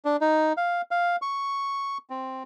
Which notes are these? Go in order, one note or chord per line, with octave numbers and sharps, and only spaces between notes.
D4
D#4
F5
F5
C#6
C4